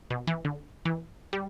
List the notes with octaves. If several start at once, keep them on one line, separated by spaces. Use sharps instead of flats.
B2
E3
D3
E3
G3